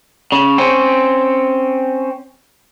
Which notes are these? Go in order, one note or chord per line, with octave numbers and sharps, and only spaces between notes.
C#3
C4 C#4